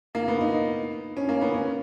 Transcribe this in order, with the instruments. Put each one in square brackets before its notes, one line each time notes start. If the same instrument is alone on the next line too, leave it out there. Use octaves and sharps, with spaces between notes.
[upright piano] A#3
B3
D#4
C#4
A#3
B3
C#4